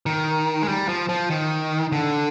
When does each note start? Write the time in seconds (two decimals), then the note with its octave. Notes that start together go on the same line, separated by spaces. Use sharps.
0.06 D#3
0.62 G#3
0.68 G3
0.88 F3
1.09 F3
1.30 D#3
1.92 D3